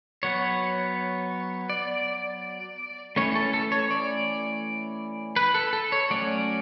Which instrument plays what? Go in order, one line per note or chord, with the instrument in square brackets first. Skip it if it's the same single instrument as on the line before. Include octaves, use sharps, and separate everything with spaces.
[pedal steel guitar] F#3 B3 C#5
D5
E3 A3 C#4 C#5
A4
A4
C#5
D5
B4
A4
A4
C#5
F#3 A3 C#4 D5